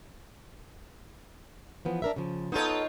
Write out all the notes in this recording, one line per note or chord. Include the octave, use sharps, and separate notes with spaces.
E3 F3 B3
D4 A#4 E5
C#3 F3
B3 D#4 F4 A4 C#5